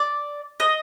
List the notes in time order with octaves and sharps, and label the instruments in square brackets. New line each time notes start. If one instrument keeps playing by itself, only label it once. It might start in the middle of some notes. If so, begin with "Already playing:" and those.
Already playing: [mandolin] D5
D#5